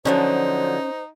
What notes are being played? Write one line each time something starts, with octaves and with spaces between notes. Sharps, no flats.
D3 F3 F#3 C#4 D#4 C5